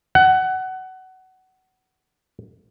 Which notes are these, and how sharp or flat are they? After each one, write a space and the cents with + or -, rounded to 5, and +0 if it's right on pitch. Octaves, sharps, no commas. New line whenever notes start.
F#5 +20